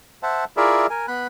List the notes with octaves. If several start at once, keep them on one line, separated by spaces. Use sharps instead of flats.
C5 E5 F#5 A5
E4 F4 G#4 A#4 D5 E5
A#4 G#5
B3 B5 F#6